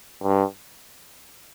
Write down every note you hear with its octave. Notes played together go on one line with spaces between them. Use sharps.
G2